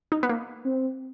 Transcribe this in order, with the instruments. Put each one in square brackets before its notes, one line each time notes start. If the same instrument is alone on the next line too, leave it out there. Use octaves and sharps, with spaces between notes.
[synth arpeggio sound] D#4
B3
A#3
[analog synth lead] C4